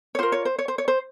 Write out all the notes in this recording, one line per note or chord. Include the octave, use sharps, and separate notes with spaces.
C#5
F4 A#4 C5
C#5
C5
C#5
C5
C#5
C5